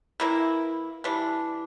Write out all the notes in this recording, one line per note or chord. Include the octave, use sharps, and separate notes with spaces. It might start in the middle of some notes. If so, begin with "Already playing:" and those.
E3 A#3 E4
E3 G3 D4